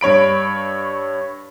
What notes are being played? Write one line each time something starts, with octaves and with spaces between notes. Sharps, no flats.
G2 C#5 B5 D7